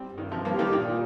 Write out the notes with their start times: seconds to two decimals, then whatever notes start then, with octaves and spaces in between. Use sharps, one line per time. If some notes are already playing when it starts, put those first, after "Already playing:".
Already playing: G3 C4
0.12 G2
0.18 D#3
0.31 G2 C3 F3
0.45 F3 A#3
0.53 G4
0.59 D#3 G3
0.73 A#2 D#3